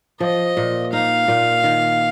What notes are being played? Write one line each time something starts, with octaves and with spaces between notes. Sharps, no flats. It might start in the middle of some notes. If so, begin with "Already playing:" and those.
F3 D#5
A#2
D#4 F5
A#2
D#3